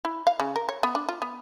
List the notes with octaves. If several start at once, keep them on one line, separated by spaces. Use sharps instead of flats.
E4
F5
C#3
A#4
C#5
B3
D4
F4
B3